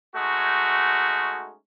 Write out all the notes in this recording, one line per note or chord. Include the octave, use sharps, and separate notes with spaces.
G#3 A3 C#4 D#4 F#4